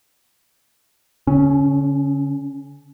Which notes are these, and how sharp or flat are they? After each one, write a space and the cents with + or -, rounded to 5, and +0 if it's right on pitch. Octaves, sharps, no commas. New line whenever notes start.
D3 -45 C#4 +0